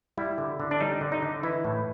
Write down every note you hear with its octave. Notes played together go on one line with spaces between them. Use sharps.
G3 E4
D3
D3
D4
G3 D#4
D3
D#4
D3
E3 E4
A2